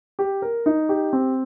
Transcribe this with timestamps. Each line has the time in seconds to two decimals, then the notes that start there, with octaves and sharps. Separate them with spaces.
0.19 G4
0.42 A#4
0.66 D#4
0.89 G4
1.13 C4